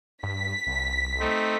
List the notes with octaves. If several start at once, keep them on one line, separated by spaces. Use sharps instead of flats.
G2 B6
C2
A3 C4 D#4